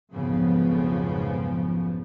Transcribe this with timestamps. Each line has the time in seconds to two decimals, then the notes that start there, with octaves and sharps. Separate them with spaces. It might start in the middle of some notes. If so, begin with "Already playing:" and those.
0.14 B1 F2 G#2 C#3 F3 B3